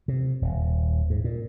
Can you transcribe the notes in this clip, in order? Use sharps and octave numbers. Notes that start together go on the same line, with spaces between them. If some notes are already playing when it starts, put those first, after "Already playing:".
C3
D#1
G#2
A#2